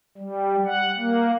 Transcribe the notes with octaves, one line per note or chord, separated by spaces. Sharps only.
G3
F#5
A#3